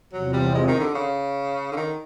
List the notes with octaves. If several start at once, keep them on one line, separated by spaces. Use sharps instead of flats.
E2 C3 F3 F#3
G3
G#3
D#3
D3
C#3
D3
D#3